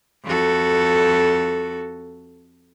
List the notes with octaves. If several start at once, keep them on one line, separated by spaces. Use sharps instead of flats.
F2 F#4 A4